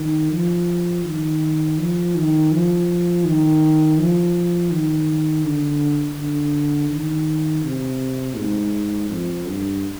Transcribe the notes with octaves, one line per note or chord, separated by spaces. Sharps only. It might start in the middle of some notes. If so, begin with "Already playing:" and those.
Already playing: D#3
F3
D#3
F3
D#3
F3
D#3
F3
D#3
D3
D3
D#3
C3
G#2
F2
G2